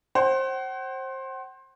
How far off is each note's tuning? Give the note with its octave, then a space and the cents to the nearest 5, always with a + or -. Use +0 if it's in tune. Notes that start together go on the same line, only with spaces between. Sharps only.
C5 +25 F#5 +40